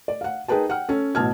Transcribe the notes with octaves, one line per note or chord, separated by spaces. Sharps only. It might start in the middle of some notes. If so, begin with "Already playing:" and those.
D5
F5 F#5
D#4 G#4 A#4 B4 G5 A5
F#5 G5 F6
C#4 A4
A1 B2 A5 F6 G#6